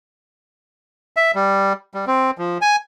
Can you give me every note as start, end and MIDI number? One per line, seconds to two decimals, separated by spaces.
1.17 1.31 76
1.35 1.73 55
1.94 2.05 55
2.07 2.31 60
2.38 2.58 53
2.61 2.76 80